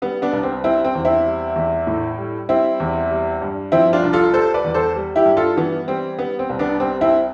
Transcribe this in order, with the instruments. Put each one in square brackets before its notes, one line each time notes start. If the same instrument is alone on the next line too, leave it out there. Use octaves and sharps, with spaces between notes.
[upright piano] G3 B3
B3 D4
C2
C4
G3 C4 E4
C4
E2
C4 E4
G3
E2
A2
G3
G3 C4 E4
E2
G3
G2
F3 C4 E4
D4 F4
C2
F4 A4
G3 A4 C5
B4 D5
E2
A4 C5
G3
E4 G4
G2
F4 A4
E3 B3
G3 C4
G3 B3
C4
C2
B3 D4
G3 C4
C4 E4